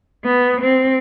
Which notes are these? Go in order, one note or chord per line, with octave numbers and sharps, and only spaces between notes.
B3
C4